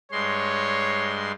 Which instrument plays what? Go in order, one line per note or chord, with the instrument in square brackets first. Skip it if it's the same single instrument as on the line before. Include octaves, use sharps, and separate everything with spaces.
[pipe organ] G2 G#3 C6 [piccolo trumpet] C#5